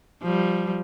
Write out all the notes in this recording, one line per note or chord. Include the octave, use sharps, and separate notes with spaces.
F3 G3